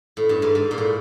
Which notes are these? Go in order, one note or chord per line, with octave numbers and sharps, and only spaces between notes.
A2
G2
G#2
G#2
A#2
A2